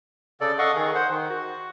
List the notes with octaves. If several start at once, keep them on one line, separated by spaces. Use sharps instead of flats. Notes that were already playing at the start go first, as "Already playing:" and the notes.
C#3 A4 D5
A4 D#5 F5 F#5 C#6
D#3 G#4
C5 F#5
D#3
F#4